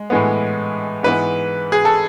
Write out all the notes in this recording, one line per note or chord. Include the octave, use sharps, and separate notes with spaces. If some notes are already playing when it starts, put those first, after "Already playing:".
Already playing: G#3
A2 E3 G#3 B3
G#2 E3 B3 B4
G#4
A4